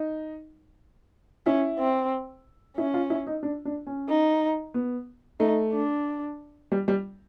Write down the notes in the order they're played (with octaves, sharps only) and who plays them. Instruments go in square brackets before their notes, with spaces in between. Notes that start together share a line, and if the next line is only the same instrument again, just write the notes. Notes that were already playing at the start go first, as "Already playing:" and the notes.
Already playing: [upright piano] D#4
[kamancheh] C#4 [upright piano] E4
[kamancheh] C4
[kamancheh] C#4 [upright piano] E4
[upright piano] F4
E4
D#4
D4
D4
C#4
[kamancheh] D#4
[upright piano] B3
[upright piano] A3 [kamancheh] D#4
[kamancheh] D4
[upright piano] G3
G3